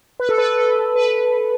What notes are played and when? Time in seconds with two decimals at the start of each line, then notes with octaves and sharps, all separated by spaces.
0.20 B4
0.29 A4
0.38 B4
0.57 A4
0.95 B4